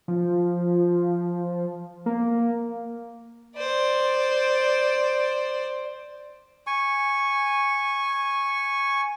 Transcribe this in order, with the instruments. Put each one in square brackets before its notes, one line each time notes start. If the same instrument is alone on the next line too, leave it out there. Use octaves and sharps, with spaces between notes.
[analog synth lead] F3
A#3
[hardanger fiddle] C5 D5
[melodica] G#5 C#6